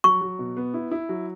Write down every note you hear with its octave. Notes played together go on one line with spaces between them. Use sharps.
F#3 C#6
F#3
B2
B3
E4
E4
F#3